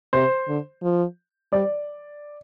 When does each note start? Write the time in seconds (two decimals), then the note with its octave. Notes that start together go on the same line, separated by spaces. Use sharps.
0.13 C3 C5
0.48 D3
0.83 F3
1.52 G3 D5